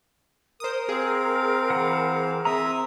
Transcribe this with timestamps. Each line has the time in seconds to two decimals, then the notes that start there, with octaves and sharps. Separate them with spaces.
0.60 A#4 C5 D#6
0.89 C4 G#4 F5
1.70 E3 F#5
2.45 C4 E5 A#5 D#6